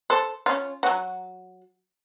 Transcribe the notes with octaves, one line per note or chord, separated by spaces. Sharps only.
A4 C5
C#4 F4
F#3 F#4